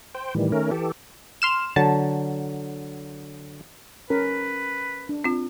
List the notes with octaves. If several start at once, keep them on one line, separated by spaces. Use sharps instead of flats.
C5 G5
A2 D#3 E3 G3
D#3 A3 C#4 A#4
E3 G4 A4
C6 F6 E7
D3 F#3 A5
C#4 A#4 B4
D4
C4 F4